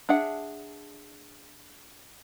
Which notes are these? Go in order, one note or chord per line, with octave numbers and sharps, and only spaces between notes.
D4 G#4 E5 F#5